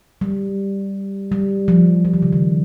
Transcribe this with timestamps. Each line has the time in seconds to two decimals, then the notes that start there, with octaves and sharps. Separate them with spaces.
0.21 G3
1.32 G3
1.68 F3
2.05 F3
2.14 D#3
2.22 C#3
2.33 D#3